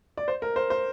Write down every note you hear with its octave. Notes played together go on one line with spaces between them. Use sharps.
D5
C5
A#4
C5
C5